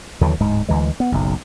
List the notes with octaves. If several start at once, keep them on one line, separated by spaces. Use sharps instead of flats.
D#2 D3 E3 F#3
D1 G#2 G#3
D2 E3 G#3
B3
F#1 B1